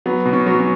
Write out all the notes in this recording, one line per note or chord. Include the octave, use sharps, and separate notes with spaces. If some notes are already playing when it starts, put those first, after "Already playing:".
F#3 B3
B2
C#4
F#3
C#4